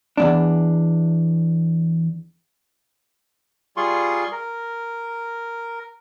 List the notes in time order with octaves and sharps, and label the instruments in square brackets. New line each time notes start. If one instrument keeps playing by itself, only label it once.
[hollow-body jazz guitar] E2 G#2 D4
[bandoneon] G3 F4 G#4 C6 C#6
A#4